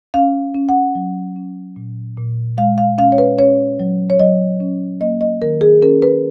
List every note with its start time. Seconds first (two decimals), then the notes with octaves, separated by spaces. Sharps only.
0.14 C#4 F5
0.54 C#4
0.69 F#5
0.95 F#3
1.36 C#4
1.76 A#2
2.17 A#2
2.58 G#3 F5
2.78 F5
2.98 C#4 F5
3.12 C#5
3.18 B4
3.38 C#4 C#5
3.79 F#3
4.10 C#5
4.19 F#3 D#5
4.60 C#4
5.01 A#3 D#5
5.21 D#5
5.42 D#3 A#4
5.61 G#4
5.82 C#4 A#4
6.02 B4